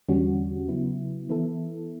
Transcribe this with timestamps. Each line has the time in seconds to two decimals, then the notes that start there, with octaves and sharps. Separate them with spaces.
0.08 E2 D3 G3 C#4 F#4
0.68 C#3 F#3 B3 E4
1.29 E3 B3 E4 A4